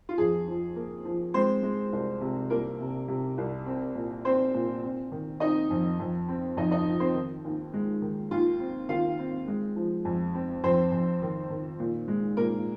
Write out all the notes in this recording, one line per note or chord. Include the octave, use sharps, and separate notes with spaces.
F4
F2 G#4
F3
A#3
F3
G#3 C4 C5
G#3
C2
C3
C2 A#3 A#4
C3
C3
C2
C4
A#2
C4 C5
A#2
C4
D#3
C4 D#4 D#5
F2
F2
C4
F2 D#4 D#5
D#4 D#5
F3
C4 C5
D#3
D#2
G#3
D#3
D#2 F4
C4
D#3 F4 F5
C4
G#3
F3
F2
C4
F2 C4 C5
F2
D#3
D#3
A#2
G#3
A#2 A#3 A#4